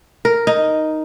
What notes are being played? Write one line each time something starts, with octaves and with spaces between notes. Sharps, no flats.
A#4
D#4